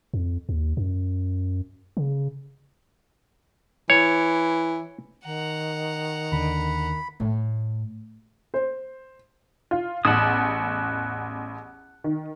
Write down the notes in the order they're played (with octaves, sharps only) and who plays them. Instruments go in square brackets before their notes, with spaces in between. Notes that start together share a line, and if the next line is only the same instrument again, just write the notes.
[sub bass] F2
D#2
F#2
C#3
[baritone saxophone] E3 [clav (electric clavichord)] C#5
[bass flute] D#3 [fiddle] F#5 A#5
[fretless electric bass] D#2 D3 [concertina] B5
[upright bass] A2
[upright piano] C5
[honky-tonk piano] F4
[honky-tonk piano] A1 E2 [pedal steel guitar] F#5 A5 D#6
[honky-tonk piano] D#3